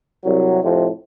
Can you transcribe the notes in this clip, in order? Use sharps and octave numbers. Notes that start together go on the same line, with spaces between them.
C2 F#3
F2 A2 C3 F3